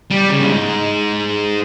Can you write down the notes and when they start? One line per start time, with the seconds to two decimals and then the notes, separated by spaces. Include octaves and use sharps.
0.10 G3
0.29 C#3
0.39 G2
0.47 G#2